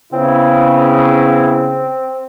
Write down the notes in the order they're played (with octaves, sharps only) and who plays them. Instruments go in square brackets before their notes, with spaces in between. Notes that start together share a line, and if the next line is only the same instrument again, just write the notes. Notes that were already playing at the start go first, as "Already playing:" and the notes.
[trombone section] C#3 [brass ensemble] B3 E4 [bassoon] C4